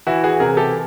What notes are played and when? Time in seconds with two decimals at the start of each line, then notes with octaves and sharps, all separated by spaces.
0.07 E3 E4 F#4
0.24 F#4 G#4
0.40 C3 G#4 A#4
0.57 G4 A4